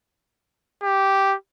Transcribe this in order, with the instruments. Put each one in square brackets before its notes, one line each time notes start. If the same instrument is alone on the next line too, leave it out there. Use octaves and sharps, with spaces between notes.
[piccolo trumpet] G4